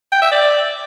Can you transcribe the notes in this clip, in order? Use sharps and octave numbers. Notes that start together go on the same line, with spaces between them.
G5
E5
D5